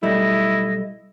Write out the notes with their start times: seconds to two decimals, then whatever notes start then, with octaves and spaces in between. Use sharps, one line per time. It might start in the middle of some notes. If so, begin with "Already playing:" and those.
0.03 B1 G3 A3 E4 D#5